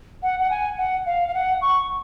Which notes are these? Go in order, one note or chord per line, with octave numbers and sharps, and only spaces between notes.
F#5
F#5
G#5
F#5
F5
F5
F#5
C#6